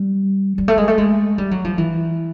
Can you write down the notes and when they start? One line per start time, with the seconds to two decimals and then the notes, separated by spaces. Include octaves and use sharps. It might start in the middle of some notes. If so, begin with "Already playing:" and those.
Already playing: G3
0.58 G3
0.68 A3
0.78 G#3
0.88 A3
0.98 G#3
1.38 G3
1.51 F#3
1.65 F3
1.78 E3